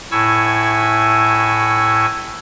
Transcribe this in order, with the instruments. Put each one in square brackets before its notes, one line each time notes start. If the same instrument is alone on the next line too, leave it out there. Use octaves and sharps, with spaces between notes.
[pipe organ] A2 E4 G#5 C#6 E6